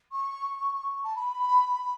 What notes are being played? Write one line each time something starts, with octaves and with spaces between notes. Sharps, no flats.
C#6
A5
B5